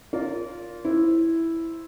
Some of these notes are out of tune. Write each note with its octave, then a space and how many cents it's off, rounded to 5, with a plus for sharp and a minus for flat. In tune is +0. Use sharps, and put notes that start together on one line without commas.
F4 +0 A#4 +0 D5 -35
E4 +0 C5 +0